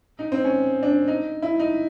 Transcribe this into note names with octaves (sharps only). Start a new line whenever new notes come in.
D#4
C4
C#4
D4
D#4
E4
D#4